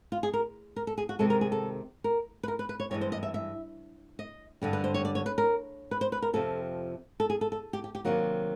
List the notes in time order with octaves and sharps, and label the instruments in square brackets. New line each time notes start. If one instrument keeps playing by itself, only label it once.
[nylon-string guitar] F4
G#4
A#4
A#4
A4
G#4
F#4
C3 D#3 G#3 A4
A#4
G#4
A4
A#4
B4
A#4
B4
B4
C#5
G2 E3 G#3 C#5
C5
D#5
E5
E5
D#5
G2 D3 G3
B4
C5
C#5
D5
C#5
B4
A#4
B4
C5
B4
A#4
F2 C3 F3 A4
A4
G#4
A4
A4
G4
G4
G4
C3 D#3 F#3 A#3 F#4